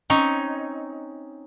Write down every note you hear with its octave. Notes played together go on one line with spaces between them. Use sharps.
C4 C#4 D#4 C#5